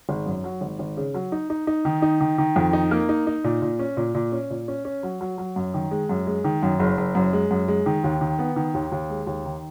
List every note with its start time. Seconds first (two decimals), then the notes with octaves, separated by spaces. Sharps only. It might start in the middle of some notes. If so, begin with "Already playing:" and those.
0.09 G#1
0.26 F#2
0.44 F#3
0.61 G#1
0.79 G#1
0.97 C#3
1.14 F#3
1.32 D#4
1.50 D#4
1.67 D#4
1.85 D#3
2.02 D#4
2.21 D#3
2.38 D#3
2.56 F2
2.73 D#4
2.91 A#3
3.09 D#4
3.27 D#4
3.44 A#2
3.62 A#2
3.79 C#4
3.97 A#2
4.15 A#2
4.32 C#4
4.50 A#2
4.68 C#4
4.85 C#4
5.03 F#3
5.21 F#3
5.38 F#3
5.56 F#2
5.74 D#3
5.91 G#3
6.09 F#2
6.27 G#3
6.44 D#3
6.63 F#2
6.80 F#1
6.98 F#1
7.15 F#2
7.33 G#3
7.51 F#2
7.68 G#3
7.86 D#3
8.04 D#2
8.21 D#3
8.39 B3
8.56 D#3
8.74 D#2
8.92 D#2
9.10 G#3
9.27 D#2
9.45 D#3